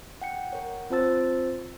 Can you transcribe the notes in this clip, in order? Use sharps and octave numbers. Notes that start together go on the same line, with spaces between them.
F#5 G5 C#7
A#4 C#5 F#5
C4 F4 C5 A5 E6 A6